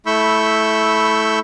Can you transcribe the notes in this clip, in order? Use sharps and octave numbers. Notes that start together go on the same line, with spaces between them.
A3 E4 B5 C#6 E6 G6